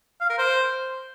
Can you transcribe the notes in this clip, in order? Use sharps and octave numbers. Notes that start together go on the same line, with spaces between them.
F5
A#4
C5